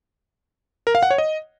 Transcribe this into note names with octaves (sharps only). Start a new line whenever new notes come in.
A#4
F5
F#5
C#5
D#5